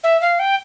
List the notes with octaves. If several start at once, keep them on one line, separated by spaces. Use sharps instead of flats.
E5
F5
G5